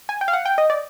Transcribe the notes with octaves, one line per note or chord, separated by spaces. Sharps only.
G#5
G5
F5
F#5
G5
D#5
D5